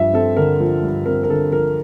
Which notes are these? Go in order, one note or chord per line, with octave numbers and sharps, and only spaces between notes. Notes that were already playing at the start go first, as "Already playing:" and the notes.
Already playing: G2 F3 E5
C4 A4
D3 A#4
F3
G2
C4 A#4
A#4
D3 A4
F3 A#4